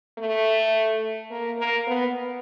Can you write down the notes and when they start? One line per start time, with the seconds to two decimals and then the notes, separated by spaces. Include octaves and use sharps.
0.18 A3
1.31 A#3
1.59 A#3
1.87 B3